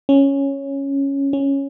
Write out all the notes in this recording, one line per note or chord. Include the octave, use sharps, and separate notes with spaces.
C#4
C#4